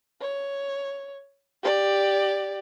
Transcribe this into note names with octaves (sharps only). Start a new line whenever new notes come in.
C#5
G4 D5